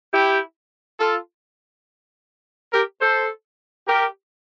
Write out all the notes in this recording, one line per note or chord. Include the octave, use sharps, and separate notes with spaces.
E4 G4
F4 A4
G4 A#4
A4 C5
G4 A#4